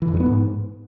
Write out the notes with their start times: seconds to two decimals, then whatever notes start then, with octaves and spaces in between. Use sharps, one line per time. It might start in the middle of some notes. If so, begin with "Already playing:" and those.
0.02 E3
0.08 F2
0.14 G2
0.20 B3
0.26 G#2